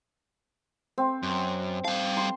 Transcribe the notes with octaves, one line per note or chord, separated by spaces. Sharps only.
C4
F#2
G3 F5 A5
C6